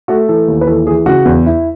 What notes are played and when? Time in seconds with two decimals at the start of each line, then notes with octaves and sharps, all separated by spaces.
0.08 A3 F#4
0.29 E3 A4
0.48 D#2
0.61 B4
0.67 E3 A4
0.87 E3 G#4
1.06 C#3 F#4
1.25 E2
1.46 E4